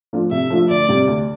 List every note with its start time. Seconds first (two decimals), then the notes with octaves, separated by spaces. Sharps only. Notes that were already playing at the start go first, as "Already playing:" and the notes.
0.13 F3 A3 D4 F4
0.31 C3 E5
0.50 F3 A3 D4 F4
0.69 D2 D5
0.88 C3 G3
1.07 D2